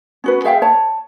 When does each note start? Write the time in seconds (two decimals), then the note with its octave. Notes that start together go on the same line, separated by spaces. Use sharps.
0.24 C#4 F#4 B4
0.44 G#4 E5 F5 G5
0.62 C#5 A5